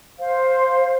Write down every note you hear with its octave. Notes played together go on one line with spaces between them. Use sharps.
C5 F5